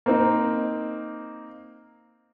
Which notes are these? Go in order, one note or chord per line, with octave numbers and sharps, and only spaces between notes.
A#3 C4 D#4